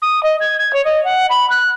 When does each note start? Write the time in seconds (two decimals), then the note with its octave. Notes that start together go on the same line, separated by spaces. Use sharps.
0.02 D#6
0.23 D#5
0.40 G#6
0.58 G#6
0.73 C#5
0.85 D#5
1.04 F#5
1.30 B5
1.50 F#6